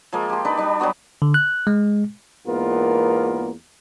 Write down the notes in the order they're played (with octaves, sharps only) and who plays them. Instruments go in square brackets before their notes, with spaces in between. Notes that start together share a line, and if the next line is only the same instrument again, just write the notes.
[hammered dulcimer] F3 G#3 A#3
G4 C6
D4 D#4 B4
G3 D4
F#3 G3 B3 F#4
[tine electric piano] D3
F#6
G#3
[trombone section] E2 G#2 A#3 B3 F4 A#4